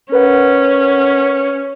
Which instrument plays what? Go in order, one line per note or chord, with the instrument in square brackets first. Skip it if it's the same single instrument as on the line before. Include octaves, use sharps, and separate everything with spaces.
[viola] C#4 [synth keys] A#4 B4 F#5